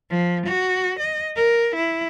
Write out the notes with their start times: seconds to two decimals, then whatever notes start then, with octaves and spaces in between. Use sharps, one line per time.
0.10 F3
0.47 F#4
1.00 D#5
1.36 A#4
1.76 E4